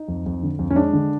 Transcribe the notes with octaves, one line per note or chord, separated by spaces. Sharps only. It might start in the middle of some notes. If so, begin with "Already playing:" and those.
Already playing: D#4
F2
F2
D3
F2
C#4
G#3 D4
D3